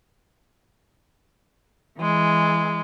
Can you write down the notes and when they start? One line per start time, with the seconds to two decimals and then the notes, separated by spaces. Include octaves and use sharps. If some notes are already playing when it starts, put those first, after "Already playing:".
1.98 E3 G#3